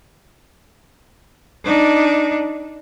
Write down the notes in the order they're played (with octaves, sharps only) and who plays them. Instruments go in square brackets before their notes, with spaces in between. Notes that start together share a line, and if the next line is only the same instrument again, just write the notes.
[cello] D4 D#4